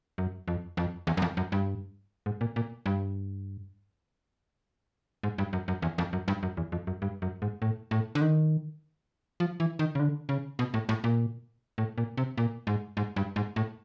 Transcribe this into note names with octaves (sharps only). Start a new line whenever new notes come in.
F#2
F2
F2
E2
F#2
F2
F#2
G2
G#2
A#2
A#2
G2
G#2
G2
F#2
F#2
E2
F2
F#2
G2
F#2
E2
F2
F#2
G2
F#2
G#2
A2
A2
D3
D#3
F3
E3
D#3
C#3
D3
C#3
B2
A2
A2
A#2
A2
A#2
C3
A#2
G#2
G#2
G2
G#2
A2